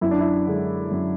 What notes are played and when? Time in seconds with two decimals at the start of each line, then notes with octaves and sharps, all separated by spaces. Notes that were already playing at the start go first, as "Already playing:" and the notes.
0.01 F#2 E4
0.11 D4
0.20 E4
0.46 D3 G#3
0.91 F#2